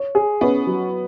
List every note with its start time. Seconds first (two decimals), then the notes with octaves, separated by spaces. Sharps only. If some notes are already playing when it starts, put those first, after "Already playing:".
Already playing: C#5
0.15 G#4
0.41 B3 C#4
0.67 F#3